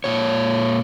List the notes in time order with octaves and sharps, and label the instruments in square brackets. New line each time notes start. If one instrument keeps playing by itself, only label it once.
[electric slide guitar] A#2 C#5